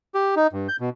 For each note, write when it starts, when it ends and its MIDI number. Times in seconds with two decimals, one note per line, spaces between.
0.14 0.35 67
0.36 0.47 63
0.53 0.68 43
0.69 0.76 91
0.80 0.89 47